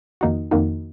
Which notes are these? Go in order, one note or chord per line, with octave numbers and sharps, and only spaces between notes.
F2 D#3 A#3 D#4 F#4
F2 D#3 A#3 D#4 F#4